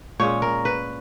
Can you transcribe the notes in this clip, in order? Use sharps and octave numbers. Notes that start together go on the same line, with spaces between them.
A#2 G#3 C#4 C#5
A#4
B4